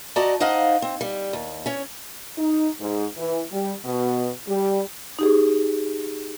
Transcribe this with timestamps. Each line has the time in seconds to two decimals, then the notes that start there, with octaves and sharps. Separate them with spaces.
0.16 F#4 D5 D#5 A5 A#5
0.40 D#4 C5 D#5 F5 F#5
0.82 C4
1.01 G3
1.33 D#2
1.66 C#4 C#5
2.38 D#4
2.80 G#2
3.17 E3
3.52 G3
3.85 B2
4.48 G3
5.19 D#4 G4 G#4